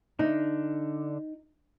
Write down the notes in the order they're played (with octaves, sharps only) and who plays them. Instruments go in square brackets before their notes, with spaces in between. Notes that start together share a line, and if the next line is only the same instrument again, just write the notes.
[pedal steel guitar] D3 D4 [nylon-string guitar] D#4